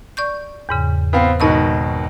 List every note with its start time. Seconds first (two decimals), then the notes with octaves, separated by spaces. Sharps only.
0.17 D5 C#6 G6
0.69 E2 G#2 C#3
1.13 B3 C4 F5
1.40 G#1 B2 D#3 D#5 B5 C#6